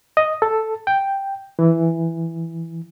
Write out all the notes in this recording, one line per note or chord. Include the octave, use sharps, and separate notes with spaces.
D#5
A4
G5
E3